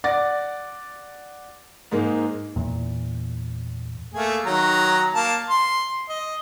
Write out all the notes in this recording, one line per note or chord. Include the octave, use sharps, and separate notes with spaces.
D5 F#5 D6 A6 A#6
G#2 G#3 A#3 D#4
E2 A#2
A3 A#3 G#4
D#3 F#3 A#5
A#3 A5
C6
D#5